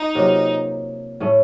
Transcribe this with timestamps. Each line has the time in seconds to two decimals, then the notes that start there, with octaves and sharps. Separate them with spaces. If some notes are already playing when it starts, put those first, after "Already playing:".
Already playing: D#4
0.15 C3 F#3 A#3 F4
1.20 A2 A3 C#4